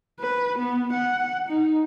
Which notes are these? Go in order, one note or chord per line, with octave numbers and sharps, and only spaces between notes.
B4
B3
F#5
D#4